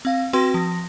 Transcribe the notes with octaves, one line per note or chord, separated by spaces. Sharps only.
C4 F5
C4 F#4 B4 G5 C6
F3 A#6